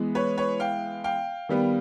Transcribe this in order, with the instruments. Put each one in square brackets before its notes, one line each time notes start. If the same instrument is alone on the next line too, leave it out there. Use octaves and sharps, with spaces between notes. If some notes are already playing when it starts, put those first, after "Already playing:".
Already playing: [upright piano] E3 G#3 B3
[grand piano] B4 C#5
B4 C#5
F5 G5
F5 G5
[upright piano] D#3 G3 B3